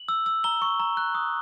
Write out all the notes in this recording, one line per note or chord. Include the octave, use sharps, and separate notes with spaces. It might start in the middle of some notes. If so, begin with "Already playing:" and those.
Already playing: F#7
E6
E6
A#5 G7
C#6
A#5
F#6
D#6